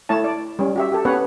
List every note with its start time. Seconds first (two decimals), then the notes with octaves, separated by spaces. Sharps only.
0.09 A3 E4 C#5 A5
0.24 D5
0.59 G3 C#4
0.76 F#4 G4 E5
0.92 G4 A4
1.05 B3 C#4 B4 C#5 F#5